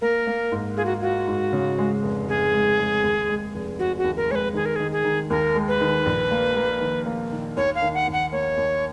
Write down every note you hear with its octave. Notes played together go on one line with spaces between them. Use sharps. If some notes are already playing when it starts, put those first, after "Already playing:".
A#3 A#4
A#3
G#2
F4 G#4
F#4
F4 F#4
G#2
C#3
G#3
F1
F1 G#4
G#3
G#3
D#2
G#3
F1
F1 F#4
F#4
D#2
A#4
G#3 C#5
B4
D#3 G#4
A#4
D#3 G#4
G#4
D#3
D#2 A#4
G#3
B4
D#3
A#1
A#3
A#3
D#3
A#3
D#3
D#2 C#5
F5
D#3
F#5
D#2
F#5
A#3 C#5
D#2